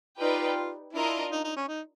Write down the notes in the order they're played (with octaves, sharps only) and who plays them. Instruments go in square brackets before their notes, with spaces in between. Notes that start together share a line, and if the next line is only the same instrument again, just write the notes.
[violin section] D#4 G4 B4 D5 G5 [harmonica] F4
[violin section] D4 F4 A#4 D#5 [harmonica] E4
[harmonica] D#4
D#4
C#4
D#4